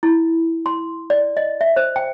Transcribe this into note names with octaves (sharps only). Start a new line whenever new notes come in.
E4
C6
D5
D#5
E5
C5
G5